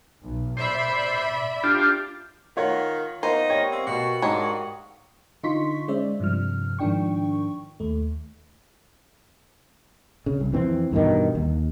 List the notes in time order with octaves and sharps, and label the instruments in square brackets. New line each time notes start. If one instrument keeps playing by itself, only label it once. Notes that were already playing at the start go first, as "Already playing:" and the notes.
[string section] B1
[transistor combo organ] C5 [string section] D5 E5 B5
[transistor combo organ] D4 F4 G4
[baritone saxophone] D#3 [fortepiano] F4 C#5 F#5
[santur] A#3 B3 [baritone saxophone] D#4 [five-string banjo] C5
[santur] G3 F5 C#6 [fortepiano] C#5
[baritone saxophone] C4
[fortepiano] B2 [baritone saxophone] F#4
[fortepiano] G#2 [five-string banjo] D#3 D4 C#5 [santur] A#5 D#6
[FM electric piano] D3 D#4 F4 C6 C#6 B6
G#3 C#4 C5 D5 E5
G2 C3 F3 F6
G#2 D#3 F3 D4 G5 C#6
D#2 A3
[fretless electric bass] C#3
C2
F2 E3 C4
E2 G2 B2 D#3
D#2